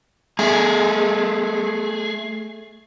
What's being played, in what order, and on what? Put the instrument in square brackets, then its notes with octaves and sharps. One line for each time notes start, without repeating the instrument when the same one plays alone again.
[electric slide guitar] A3 G#4